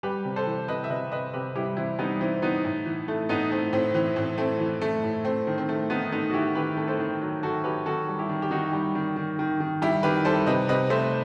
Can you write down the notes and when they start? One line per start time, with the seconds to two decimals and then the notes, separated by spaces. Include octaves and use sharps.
0.03 G3 G4 B4
0.25 C3
0.36 A4 C5
0.46 E3
0.68 C3 B4 D#5
0.84 E5
0.90 C3 B4 D#5
1.12 C3 B4 D#5
1.33 C3 G4 B4
1.55 G3 E4 G4
1.77 E3 C4 E4
1.99 G3 B3 D#4
2.20 E3 C4 E4
2.42 E3 B3 D#4
2.64 A2
2.85 E3
3.08 A3
3.29 A2 B3 D#4
3.51 A3 C4
3.73 A2 C4
3.94 E3 C4
4.16 A2 C4
4.38 A3 C4
4.60 E3
4.81 A3
5.03 A2
5.25 A3 C4
5.47 D#3
5.58 C4
5.69 A3
5.90 D#3 B3 D#4
6.12 A3 B3 D#4
6.30 F#4
6.34 D#3 E4 G4
6.55 D#3 G4 B4
6.77 A3
6.88 A4 C5
6.99 D#3
7.21 F#3
7.43 D#3 F#4 A4
7.64 F#3 G4 B4
7.86 D#3 F#4 A4
8.08 G3
8.18 E4 G4
8.29 D#3
8.42 G4
8.51 D#3 D#4 F#4
8.73 G3
8.95 D#3
9.16 D#3
9.39 D#3
9.60 D#3
9.82 G3 E4 G4
10.03 D#3 G4 B4
10.25 G3 A4 C5
10.47 C3 B4 D#5
10.69 C3 B4 D#5
10.90 A3 C5 E5